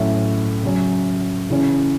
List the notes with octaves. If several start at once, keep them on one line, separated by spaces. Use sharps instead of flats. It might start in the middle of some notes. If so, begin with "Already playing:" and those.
Already playing: A2 F#3 A3 C#4 E5
C#3 F#3 C#4
C#3 E3 C#4